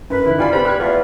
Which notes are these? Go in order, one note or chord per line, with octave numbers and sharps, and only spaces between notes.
F#2 B4
D#3 E3 E4
G3 F4 D5 G#5 B5
B3 G4 B4 C5 B5
F6 F#6 G#6
E2 A3 F4